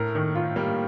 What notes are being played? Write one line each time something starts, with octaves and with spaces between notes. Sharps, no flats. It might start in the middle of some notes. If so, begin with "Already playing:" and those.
Already playing: A2 A3 A#4
D#3
F4
G3 A#3